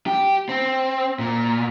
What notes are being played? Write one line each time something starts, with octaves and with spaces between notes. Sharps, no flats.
G4
C4
A#2